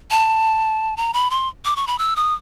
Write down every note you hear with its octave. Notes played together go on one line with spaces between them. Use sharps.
A5
A#5
B5
C6
D6
C#6
B5
E6
D#6